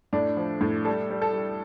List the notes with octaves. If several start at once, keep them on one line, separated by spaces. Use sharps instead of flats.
A2 D4
F3
A2
G3 A4
G3
A4
G3